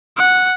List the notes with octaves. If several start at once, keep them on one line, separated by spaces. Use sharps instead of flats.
F#5